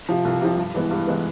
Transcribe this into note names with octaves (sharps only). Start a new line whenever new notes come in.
C3 F3
C2
C3 F3
G2
E3 G#3 B3
G2
E3 G#3 B3